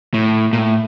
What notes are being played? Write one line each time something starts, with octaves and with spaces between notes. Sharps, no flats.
A2
A#2
A2